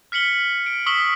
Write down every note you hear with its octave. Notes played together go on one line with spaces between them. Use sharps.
F6 B6 C#7 F#7 G7
D7
C#6 D#6 E6 B6 F#7 G7